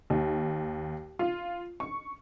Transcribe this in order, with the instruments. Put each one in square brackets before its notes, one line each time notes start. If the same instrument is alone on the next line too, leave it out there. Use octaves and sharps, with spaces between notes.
[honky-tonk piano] D#2
F4
C#6